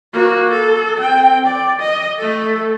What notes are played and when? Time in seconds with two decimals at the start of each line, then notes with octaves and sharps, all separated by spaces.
0.13 A#3 F#4
0.51 A4
0.99 C4 G5
1.44 D5
1.80 D#5
2.18 A3 A4